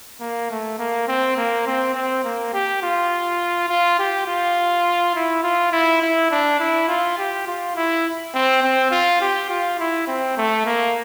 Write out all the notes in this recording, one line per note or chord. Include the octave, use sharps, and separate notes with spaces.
A#3
A3
A#3
C4
A#3
C4
C4
A#3
G4
F4
F4
G4
F4
E4
F4
E4
E4
D4
E4
F4
G4
F4
E4
C4
C4
F4
G4
F4
E4
C4
A3
A#3